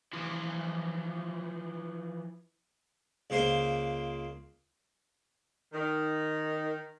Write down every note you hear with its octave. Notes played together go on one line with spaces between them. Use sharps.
E3 F3
C#2 C#3 A#3 C5 C6
D#3